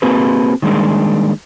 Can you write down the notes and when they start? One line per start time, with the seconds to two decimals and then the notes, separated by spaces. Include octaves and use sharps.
0.02 A#3 C4 F#4 G#4 B4
0.62 D#3 G3 G#3 A#3 D4